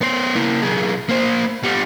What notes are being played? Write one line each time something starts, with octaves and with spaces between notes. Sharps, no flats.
B3 C5
A#3 E4
B1 G#4
A#3 C5
G3 B3